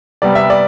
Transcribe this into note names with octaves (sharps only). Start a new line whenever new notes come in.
C3 G3 B3 D5
E5
D5